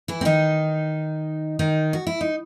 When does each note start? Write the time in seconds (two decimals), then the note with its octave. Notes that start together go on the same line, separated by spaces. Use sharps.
0.08 E3 E4
0.21 C4
0.25 D#3 D#4
1.59 D#3 D#4
1.93 F#4
2.07 E4
2.21 D#4